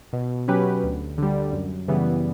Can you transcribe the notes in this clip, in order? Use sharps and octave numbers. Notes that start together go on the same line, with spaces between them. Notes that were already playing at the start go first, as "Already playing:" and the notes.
B2
F#3 C#4 G4 B4
D2
D3 G3
F#2
C#3 E3 G3 B3